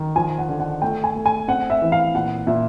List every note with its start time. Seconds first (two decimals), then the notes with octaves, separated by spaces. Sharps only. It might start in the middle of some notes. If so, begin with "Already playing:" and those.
Already playing: D#3
0.16 F3 G#5
0.38 F#5
0.49 D3
0.60 F#5
0.82 A3 G5
1.04 G#5
1.16 A3
1.26 G#5
1.48 C4 F#5
1.70 E5
1.82 E3
1.92 F5
2.14 A#2 F#5
2.47 A#2 E5